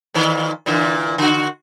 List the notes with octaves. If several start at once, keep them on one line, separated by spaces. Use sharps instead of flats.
F2 A#2 D#3
A#2 D3 E3
D3 F#4